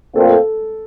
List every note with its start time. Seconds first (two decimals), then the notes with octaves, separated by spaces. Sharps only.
0.16 A#2 A3 C4 F4 A4